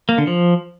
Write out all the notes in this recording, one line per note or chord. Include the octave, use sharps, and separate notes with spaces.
A#3
D3
F3